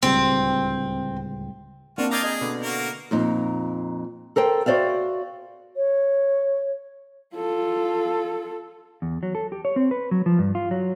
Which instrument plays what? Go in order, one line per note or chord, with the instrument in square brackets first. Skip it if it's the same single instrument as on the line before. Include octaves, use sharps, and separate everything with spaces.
[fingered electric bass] D1 C#2 G3 [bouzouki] C4
[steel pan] A#3 C4 D4 [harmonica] F4 F#4
[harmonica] D5 D#5 F5 [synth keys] A#5 G6 G#6
[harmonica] G#4 [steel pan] D#5
[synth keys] B2 D3
[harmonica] A#3 F#4 A#4
[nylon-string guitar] F2 A#2 D#4
A4 A#4 C5 G5
F#4 C5 D5 E5 F5
[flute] C#5
[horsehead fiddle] F4 A4
[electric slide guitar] E2
F#3
A4
G4
C#5
C4
B4
F#3
F3
G2
F4
F#3